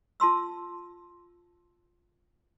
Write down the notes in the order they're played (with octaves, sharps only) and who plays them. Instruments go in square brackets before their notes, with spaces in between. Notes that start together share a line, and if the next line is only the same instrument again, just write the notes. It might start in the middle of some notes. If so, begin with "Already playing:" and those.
[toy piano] F4 A5 C6 E6